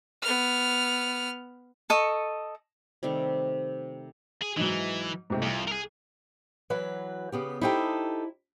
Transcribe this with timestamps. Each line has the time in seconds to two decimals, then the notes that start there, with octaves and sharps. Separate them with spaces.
0.22 B3 F6
1.90 A4 D#5 C#6
3.03 C3 D#3 G3 A3
4.42 G#4
4.57 G#2 E3 F#3 D#4
5.30 G#2 C3 A3
5.42 C2 F2
5.68 G#4 A#4
6.70 E3 F#3 B4
7.32 C#3 B3 G4
7.61 D#4 E4 G4 A4 C5 G5